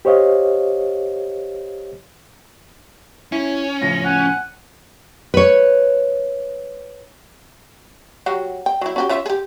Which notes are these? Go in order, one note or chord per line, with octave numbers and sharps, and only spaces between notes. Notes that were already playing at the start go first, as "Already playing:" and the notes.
G4 C5 C#5 D#5 F5
C#4 E4
A2 C#3 F3 A#6
F#5 G#5
B4 C#5
F#3 F#4 G4
G5
F#3 E4
C#4 F#4 G4
C#4 F4 E5
G4 G#4